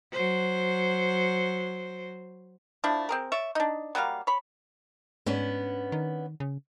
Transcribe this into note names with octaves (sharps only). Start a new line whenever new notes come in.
F#3 C5
F3 A3 D4 E4
C4 G#4 A#4
C#5 D5 E5
D4 D#4
F#3 G3 A#3 F5
C#5 B5
G#2 B3 C#4 D4
D#3
C#3